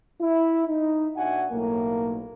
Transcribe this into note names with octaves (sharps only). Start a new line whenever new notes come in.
E4
D#4
A#2 D4 F#4 E5 F#5 G#5
B1 A2 A#3